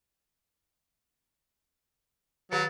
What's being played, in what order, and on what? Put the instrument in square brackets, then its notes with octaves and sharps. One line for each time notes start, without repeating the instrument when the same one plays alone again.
[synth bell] D#3 B4 C#7 [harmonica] F#3 [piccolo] A6